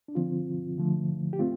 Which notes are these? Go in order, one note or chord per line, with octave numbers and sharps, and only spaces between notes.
D4
D3 F3 C4 F4
D3 F3 A3
G4
A3 C4 F4